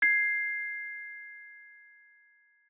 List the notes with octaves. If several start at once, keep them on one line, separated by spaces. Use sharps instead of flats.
G#6 C7